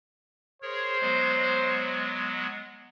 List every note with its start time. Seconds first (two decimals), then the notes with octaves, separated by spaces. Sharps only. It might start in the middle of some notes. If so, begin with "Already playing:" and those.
0.62 G#4 A#4 C5 C#5
1.01 F#3 G#3 B3